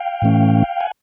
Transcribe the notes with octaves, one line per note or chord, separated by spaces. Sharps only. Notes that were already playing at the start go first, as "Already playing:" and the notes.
Already playing: F5 G5
A2 E3 A3 C#4
F#5 G#5